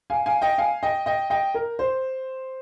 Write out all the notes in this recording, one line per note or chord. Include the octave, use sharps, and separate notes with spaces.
F5 G#5
F5 G#5
D#5 G5
F5 G#5
D#5 G5
D#5 G5
D#5 G5
A#4
C5